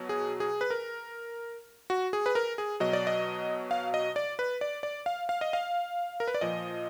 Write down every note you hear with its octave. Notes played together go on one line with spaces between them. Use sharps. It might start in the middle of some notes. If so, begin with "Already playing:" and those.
Already playing: B2 F#3
G#4
G#4
B4
A#4
F#4
G#4
B4
A#4
G#4
B2 F#3 D#5
D5
D#5
F5
D#5
D5
B4
D5
D5
F5
F5
D#5
F5
A#4
B4
D5
A#2 F3 D#5